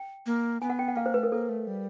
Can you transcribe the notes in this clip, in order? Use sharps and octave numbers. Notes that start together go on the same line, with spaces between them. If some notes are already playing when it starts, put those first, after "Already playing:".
Already playing: G5
A#3
B3 G#5
F#5
G5
F#5
A#3 F5
C5
A3 B4
A#4
A#3 A4
A3
G3